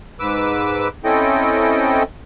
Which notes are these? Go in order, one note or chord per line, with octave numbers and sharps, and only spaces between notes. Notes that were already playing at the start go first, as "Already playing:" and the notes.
G#2 B4 D6 E6
C4 C#4 E4 A4 D#5 G5